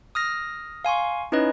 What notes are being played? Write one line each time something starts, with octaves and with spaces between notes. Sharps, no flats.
D#6 F6 A#6
F5 G#5 C6 C#6
C#4 D#4 E4 B4 C#5 D#5